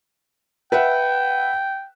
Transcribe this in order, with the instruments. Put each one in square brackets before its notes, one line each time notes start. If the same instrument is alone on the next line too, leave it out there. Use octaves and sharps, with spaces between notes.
[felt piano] B4 E5 F#5 [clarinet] G5